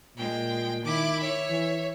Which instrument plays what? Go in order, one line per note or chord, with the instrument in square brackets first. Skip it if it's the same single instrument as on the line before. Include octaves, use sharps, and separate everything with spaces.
[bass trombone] A#2 [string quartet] G#3 G5
[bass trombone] D#3 [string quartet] E4 D6
[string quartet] C#5 E5
[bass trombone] E3